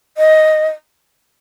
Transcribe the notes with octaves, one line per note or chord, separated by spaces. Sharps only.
D#5